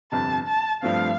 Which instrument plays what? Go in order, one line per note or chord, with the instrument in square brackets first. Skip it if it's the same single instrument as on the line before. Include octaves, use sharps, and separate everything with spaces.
[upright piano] G1 F2 C3 [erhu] A5
[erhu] A5
[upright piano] G2 F3 A3 C4 [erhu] F5